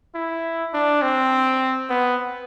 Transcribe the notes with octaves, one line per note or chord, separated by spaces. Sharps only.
E4
D4
C4
B3